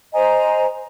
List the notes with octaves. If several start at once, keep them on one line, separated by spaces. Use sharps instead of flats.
C5 D#5 G#5 A#5